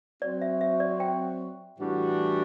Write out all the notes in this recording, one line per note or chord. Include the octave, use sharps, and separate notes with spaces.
F#3 C4 F#4 D5
E5
E5
D5
G5
A2 E3 G3 D4 F#4